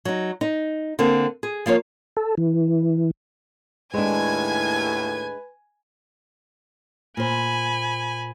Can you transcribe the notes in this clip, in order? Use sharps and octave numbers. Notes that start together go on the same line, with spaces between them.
F#3 D#4
D#4
D3 A#3 C4
G#4
F3 A#3 B4 C#5
A4
E3
D#2 A2 G#3 D4 B4 G#5 G#6
A#2 C5 G#5 B5